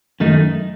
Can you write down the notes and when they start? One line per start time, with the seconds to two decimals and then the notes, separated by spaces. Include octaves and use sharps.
0.20 F#2 D#3 A3 D#4